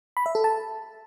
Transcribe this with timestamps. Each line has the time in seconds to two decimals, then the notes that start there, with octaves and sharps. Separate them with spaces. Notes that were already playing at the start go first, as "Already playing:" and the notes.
0.17 B5
0.26 E5
0.35 A4
0.44 A5